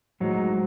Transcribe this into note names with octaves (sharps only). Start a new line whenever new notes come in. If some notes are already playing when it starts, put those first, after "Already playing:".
A2 F#3 G#3 D#4 G#4 C5